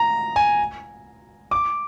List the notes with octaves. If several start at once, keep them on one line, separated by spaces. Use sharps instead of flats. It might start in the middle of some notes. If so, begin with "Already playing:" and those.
Already playing: A#5
G#5
D6